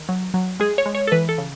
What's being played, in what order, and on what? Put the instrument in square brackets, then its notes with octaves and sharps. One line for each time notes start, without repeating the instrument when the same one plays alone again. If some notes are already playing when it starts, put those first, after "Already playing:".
Already playing: [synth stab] D#3
F#3
F#3
G#3 G#4
C#5
G#3
C#5
A4
E3 B4
A4
C#3